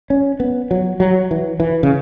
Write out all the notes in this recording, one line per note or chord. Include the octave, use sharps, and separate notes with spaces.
C#4
B3
F#3
F#3
E3
E3
C#3